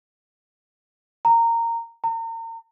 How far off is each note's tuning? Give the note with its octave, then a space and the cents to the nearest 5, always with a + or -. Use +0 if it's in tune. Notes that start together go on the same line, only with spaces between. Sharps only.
A#5 -15
A#5 -40